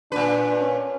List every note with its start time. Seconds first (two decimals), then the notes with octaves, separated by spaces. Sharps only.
0.12 A#2 D4 B4
0.60 C#4